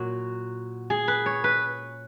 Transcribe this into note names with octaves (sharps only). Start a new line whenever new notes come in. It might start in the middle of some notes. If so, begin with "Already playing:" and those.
Already playing: A#2 F#3 F#4
G#4
B4
C#5
B4